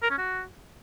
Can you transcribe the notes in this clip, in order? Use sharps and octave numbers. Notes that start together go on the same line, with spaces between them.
A#4
C#4
F#4